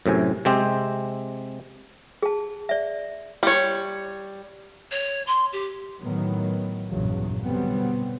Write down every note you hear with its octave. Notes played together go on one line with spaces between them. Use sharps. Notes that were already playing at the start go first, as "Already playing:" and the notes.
F#2 A2 C3 G#5
C3 G#3 C4 G4
G#4 A5
D5 E5
G3 C#5
C#5
C6
G4
A2 D#3 E3 F#3 B3
A#1 E2 G2 C#3 F#3
B2 D3 F#3 G3 B3 C4